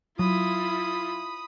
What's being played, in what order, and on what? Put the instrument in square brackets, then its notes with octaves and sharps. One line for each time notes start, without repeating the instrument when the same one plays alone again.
[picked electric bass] F#3 [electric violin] E4 F4 [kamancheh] B5 D#6